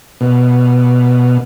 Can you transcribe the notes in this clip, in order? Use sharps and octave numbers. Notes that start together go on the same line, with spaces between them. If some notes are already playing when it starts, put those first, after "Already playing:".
B2